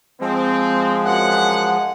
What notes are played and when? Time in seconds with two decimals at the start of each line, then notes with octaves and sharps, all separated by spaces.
0.21 F3 G#3 C4
1.05 F#2 F#5